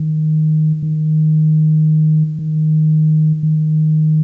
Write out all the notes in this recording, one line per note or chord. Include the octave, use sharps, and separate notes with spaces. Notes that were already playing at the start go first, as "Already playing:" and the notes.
Already playing: D#3
D#3
D#3
D#3